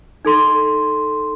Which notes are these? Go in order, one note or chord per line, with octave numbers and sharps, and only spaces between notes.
D#4 A4 C6